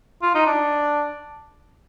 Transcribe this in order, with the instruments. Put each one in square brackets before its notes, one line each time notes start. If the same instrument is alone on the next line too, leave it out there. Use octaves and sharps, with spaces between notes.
[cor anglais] F4
D#4
D4